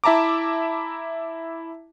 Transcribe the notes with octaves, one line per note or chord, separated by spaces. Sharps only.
E4 E5 A5 A#5 D6